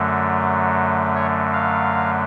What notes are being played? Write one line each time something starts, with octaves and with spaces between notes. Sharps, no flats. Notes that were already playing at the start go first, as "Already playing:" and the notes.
Already playing: F#2 D3 F#3 A3
C#5
F5